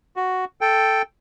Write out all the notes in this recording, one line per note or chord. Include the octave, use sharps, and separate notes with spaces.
F#4
A4 G5